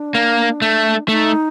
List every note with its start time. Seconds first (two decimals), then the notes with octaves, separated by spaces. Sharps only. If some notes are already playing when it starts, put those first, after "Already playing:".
Already playing: D4
0.15 A#3
0.62 A3
1.09 A3 D#4